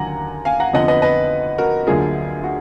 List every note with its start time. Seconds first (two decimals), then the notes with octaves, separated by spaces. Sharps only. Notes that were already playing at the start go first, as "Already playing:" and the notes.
Already playing: D#2 D3 F#3 F#5 G#5 A#5
0.45 F5 G#5
0.60 F#5 A#5
0.74 F2 D3 F3 B3 D#5 F#5
0.88 B4 D#5
1.02 B4 D#5
1.58 F#4 A#4
1.87 D2 D3 F#3 A#3 F4 G#4
2.44 F#4